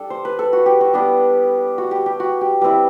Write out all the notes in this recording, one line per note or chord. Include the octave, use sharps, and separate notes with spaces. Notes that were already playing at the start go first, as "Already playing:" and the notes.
Already playing: G3 D4 A4
C5
B4
A4
F#4
G4
F#4
G3 B3 D4 G4
F#4
G4
G4
F#4
G4
G3 C4 E4 B4